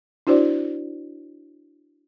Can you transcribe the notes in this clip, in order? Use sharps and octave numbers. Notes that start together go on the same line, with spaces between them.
D4 E4 F#4 C5 D5